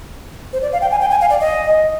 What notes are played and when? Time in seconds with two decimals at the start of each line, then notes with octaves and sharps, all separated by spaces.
0.53 C5
0.62 D5
0.73 F5
0.81 G5
0.91 G#5
1.01 G5
1.10 G#5
1.21 F5
1.30 D5
1.40 D#5